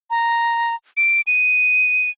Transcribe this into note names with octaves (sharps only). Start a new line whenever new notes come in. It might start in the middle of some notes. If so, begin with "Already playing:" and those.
A#5
D7
D#7